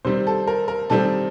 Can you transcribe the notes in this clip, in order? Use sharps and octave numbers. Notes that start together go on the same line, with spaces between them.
C3 D#3 G3 C4 C5
A4
A#4
A#4
C3 D#3 G3 C4 A4